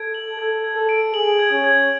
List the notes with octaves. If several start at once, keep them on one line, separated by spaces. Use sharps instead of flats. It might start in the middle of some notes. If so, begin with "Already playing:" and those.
Already playing: A4 G#6 D7
F#7
A4 G#6
G#6
A4
D7
G#4 F#7
G#6
C#4
G#6